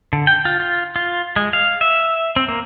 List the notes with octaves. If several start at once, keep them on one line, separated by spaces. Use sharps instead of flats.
D3
G5
F4
F4
F4
G#3
F5
E5
C4
A#3